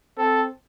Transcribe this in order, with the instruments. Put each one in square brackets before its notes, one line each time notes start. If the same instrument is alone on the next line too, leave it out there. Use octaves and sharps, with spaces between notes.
[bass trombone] C4 [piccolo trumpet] A4